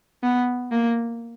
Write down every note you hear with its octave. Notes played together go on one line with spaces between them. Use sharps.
B3
A#3